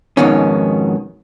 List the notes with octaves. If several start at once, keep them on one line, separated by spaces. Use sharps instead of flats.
F2 G#2 B2 D#3 C#4